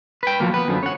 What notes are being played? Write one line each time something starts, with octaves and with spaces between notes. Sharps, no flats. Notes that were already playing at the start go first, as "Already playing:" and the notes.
B4 G5
F3 F#3 A#3
B3 B4
F#2 D3 F3
C#5 F#5